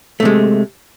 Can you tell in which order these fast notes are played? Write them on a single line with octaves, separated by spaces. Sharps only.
A3 C3 G#3